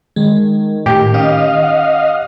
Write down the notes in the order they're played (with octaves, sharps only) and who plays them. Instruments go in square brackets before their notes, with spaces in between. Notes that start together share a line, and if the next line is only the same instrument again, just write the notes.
[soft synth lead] D#3 [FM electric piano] G#3
[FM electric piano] A2 [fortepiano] G4
[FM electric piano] C#4 [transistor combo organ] D#5 F5
[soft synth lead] F#5